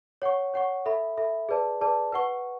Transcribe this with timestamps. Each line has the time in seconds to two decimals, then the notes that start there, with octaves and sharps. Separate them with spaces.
0.22 C#5 F#5 C#6
0.54 C#5 F#5 C#6
0.86 A4 E5 B5
1.17 A4 E5 B5
1.49 G#4 B4 D5 A5
1.81 G#4 B4 D5 A5
2.12 B4 F#5 C#6